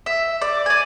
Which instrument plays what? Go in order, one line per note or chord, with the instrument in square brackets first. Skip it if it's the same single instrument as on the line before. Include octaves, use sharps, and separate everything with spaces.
[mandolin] E5
D5
D5 G#5